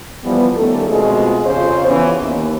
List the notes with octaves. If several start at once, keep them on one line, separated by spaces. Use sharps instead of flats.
E3 F3 G3 B3
D#3 G3 A3 C#4 A4
B2 G#3 A3 C4 F4 G#4
F2 C#3 F4 G4 G#4 C5
E3 B3 C#4
D#2